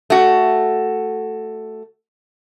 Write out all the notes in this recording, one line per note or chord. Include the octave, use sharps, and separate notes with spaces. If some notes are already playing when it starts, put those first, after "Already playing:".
A3 F#4